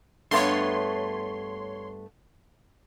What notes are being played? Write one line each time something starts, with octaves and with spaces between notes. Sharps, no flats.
G2 A3 B3 C#5 C6